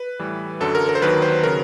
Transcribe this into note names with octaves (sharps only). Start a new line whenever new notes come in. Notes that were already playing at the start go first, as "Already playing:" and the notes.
Already playing: B4
A2 E3 G3
F#2 D3 F#3 A4
A#4
A#4
C5
D#2 D#3 F#3 B4
C5
C#3 F#3 A#4